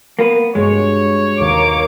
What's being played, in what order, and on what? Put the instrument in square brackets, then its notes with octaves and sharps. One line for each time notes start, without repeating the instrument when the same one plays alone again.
[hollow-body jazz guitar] A#3 B3 B4
[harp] G2 B2 [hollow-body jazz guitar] G#3 [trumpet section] C#5
[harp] D#2 B2 [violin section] A#3 D6